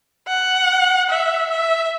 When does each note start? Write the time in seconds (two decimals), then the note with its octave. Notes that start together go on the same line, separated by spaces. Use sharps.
0.28 F#5
1.10 E5
1.51 E5